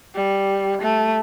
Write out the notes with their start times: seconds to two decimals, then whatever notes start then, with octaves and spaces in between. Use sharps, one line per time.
0.15 G3
0.82 A3